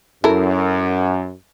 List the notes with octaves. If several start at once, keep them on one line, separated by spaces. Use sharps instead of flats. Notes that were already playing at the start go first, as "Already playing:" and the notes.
F#2 E4 A4 A#4